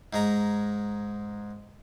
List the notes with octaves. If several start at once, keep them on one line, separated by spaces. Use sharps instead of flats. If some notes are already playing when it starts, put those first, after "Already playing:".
G#2 G#3 A#5